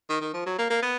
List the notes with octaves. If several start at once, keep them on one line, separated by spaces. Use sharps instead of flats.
D#3
D#3
F3
F#3
A#3
A#3
B3